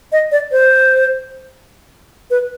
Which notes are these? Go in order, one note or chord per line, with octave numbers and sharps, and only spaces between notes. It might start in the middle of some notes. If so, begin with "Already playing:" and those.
D#5
D5
C5
B4